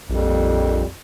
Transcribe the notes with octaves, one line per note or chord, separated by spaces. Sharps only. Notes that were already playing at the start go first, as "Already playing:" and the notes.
A#1 F2 A#2 G3